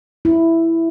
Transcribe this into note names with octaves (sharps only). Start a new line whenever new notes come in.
E4